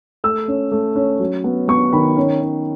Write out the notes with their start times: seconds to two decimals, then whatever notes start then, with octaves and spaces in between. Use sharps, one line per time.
0.24 A3 E6
0.48 C#4
0.72 A3
0.96 C#4
1.20 F#3
1.44 B3
1.68 B3 C#6
1.93 D#3 B5
2.17 C#4
2.41 C#4